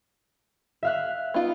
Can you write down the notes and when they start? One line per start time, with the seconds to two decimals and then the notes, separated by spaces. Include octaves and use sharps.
0.83 E5 F5 F#6
1.34 B3 D#4 F4